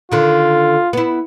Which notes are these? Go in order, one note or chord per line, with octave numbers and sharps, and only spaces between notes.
D3 D#3 F4
B3 E4